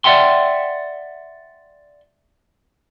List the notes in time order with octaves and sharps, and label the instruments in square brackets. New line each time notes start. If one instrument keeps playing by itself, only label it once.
[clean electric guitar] D5 E5 F#5 G5 C6